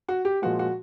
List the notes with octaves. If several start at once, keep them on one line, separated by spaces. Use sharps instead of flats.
F#4
G4
A#2 F3 G#3 F#4
F#4